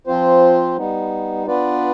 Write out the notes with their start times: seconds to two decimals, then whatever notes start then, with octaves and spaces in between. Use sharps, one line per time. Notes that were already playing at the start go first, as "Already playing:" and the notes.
0.07 F3 C4 F4 C5
0.77 G3 B3 D#4
1.47 B3 D4 F4 B4 D5